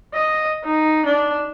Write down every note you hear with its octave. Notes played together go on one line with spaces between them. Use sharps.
D#5
D#4
D4